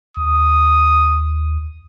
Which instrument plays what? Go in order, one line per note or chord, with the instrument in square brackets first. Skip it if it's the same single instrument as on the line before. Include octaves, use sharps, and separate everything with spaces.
[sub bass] D#2 [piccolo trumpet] D#6